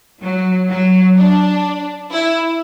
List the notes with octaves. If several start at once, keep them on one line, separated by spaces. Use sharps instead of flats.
F#3
F#3
D4
E4